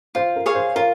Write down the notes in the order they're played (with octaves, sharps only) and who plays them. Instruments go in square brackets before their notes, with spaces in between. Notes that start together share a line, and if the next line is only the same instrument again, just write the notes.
[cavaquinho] F4 [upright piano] C5
[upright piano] A#4
[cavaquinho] G#4 C#5 F5
[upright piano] C5
[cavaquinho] F4 [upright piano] A#4